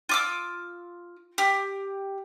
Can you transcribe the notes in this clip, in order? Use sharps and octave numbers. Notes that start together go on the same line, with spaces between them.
F4 D6 E6
G4